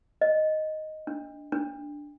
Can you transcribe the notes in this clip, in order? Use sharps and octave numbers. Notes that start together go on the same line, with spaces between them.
D#5
D4
D4